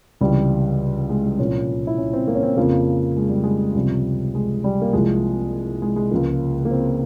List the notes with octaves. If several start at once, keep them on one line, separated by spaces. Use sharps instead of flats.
C#2 C3 E3 G3
G#3
G3
C2 A#2 F3 C#4
E4
C#4
C4
A#3
C#4
C4
F2 C#3 F3 A#3
G#3
G3
G#3
C#2 C3 F3 G3
G#3
G3
A#3
C2 C3 F3 G#3
G#3
G#3
C#2 C#3 F3 A#3
A#3
C4